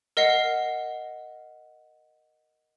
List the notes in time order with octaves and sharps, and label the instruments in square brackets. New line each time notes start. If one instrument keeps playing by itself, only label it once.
[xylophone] A#4 D#5 F#5 C7